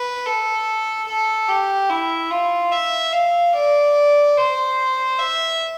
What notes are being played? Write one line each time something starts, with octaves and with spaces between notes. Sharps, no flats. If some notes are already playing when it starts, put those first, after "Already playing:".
Already playing: B4
A4
A4
G4
E4
F4
E5
F5
D5
C5
E5